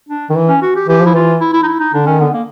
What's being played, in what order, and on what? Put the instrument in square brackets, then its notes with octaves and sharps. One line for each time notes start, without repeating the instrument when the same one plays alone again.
[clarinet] D4
[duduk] D#3
E3
[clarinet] C#4
F#4
G4
[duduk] E3 [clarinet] G4
[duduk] F3
[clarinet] E4
[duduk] E3 [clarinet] F4
[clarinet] E4
E4
D#4
E4
D#4
[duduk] D3 [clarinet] D4
[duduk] D#3 [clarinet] C#4
[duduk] D3 [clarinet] B3
[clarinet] A#3